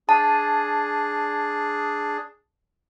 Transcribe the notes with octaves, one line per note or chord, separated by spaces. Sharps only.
D4 G#4 A5